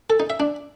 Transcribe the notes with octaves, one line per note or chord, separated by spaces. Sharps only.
A4
D#4
E5
D4